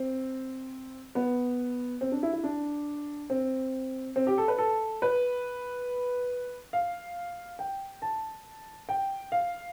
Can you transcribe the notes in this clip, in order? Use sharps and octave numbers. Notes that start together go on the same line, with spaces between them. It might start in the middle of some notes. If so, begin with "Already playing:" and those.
Already playing: C4
B3
C4
D4
E4
E4
D4
C4
C4
G4
A4
B4
A4
B4
F5
G5
A5
G5
F5